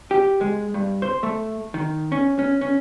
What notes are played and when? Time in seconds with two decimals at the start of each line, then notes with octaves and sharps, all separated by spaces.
0.11 G4
0.41 G#3
0.74 G2
1.02 C5
1.23 A3
1.74 D#3
2.12 C#4
2.39 C#4
2.61 C#4